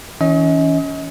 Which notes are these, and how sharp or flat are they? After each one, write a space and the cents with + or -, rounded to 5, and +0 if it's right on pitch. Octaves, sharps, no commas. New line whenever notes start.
E3 -30 C#4 +15 D#5 +40